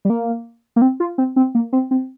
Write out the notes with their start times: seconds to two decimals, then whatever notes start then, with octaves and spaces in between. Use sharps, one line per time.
0.05 G3
0.10 A#3
0.76 A#3
0.82 C4
1.00 F4
1.18 C4
1.36 C4
1.55 A#3
1.73 C4
1.91 C4